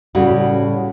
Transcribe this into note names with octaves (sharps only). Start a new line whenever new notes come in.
A2 C#3 G3 F#4